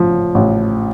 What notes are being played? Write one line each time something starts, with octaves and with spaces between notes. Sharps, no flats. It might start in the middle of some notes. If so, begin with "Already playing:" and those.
Already playing: A1 F3
A1